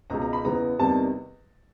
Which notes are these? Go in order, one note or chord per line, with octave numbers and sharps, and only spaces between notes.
C#2 B2 G#3 A#5
A#5
B5
E2 C#3 E3 G#3 B3 A#5
E2 C3 D#3 G3 A5